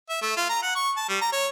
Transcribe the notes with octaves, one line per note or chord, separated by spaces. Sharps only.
E5
A3
F4
A#5
F#5
C#6
A5
G3
A#5
C#5